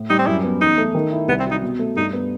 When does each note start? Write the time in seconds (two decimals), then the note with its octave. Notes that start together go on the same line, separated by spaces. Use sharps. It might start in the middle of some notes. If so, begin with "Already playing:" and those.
Already playing: A2
0.10 G3 D#4
0.19 C4
0.27 F#2 E4
0.44 B3
0.61 E2 D#4
0.78 A3
0.95 D#3
1.12 E4
1.28 C2 B3
1.40 C4
1.45 F#3
1.51 D#4
1.63 B2
1.79 A3
1.96 G2 D#4
2.13 B3